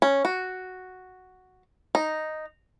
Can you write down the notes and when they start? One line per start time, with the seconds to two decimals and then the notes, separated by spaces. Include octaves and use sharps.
0.02 C#4
0.25 F#4
1.95 D#4